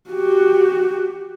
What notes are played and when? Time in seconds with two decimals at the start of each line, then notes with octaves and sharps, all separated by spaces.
0.10 F#4 G4